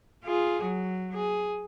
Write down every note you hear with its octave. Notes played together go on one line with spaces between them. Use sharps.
F4 G#4
F#3
G#4